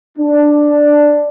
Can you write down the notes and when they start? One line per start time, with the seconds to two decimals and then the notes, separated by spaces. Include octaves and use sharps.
0.18 D4